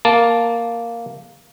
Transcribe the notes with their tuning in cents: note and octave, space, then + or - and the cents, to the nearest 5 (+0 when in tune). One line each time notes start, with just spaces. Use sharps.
A#3 +0 A5 +0